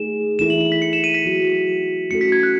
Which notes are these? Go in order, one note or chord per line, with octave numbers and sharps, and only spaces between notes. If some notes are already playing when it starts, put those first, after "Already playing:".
Already playing: A3 D#4 G#4 E7
E3 B3 E4 A4 E7
F#7
E7
B6
C#7
E7
D#7
B6
F#3 B3 F#4
A3 C#4 F#4 A4 C#7
B6
G#6
F#6